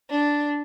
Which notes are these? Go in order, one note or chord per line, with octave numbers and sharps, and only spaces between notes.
D4